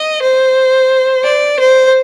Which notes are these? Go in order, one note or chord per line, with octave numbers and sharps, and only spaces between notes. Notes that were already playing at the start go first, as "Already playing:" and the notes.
Already playing: D#5
C5
D5
C5